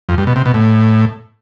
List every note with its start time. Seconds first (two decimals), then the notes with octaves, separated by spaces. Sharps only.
0.09 F2
0.18 G2
0.27 B2
0.36 C3
0.46 B2
0.54 A2